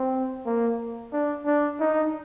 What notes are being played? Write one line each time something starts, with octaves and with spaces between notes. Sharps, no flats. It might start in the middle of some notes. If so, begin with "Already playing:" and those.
Already playing: C4
A#3
D4
D4
D#4